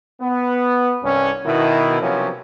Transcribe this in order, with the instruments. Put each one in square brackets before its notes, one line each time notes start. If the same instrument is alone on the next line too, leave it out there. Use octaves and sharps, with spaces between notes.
[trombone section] B3
C2 G2 C#4
B2 D#3 E4
C3 F3 F#3 A#3 B3 C#4